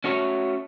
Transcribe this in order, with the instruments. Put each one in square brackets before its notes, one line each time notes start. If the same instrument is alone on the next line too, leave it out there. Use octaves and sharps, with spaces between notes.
[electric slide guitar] A3 C#4 F#4 C#5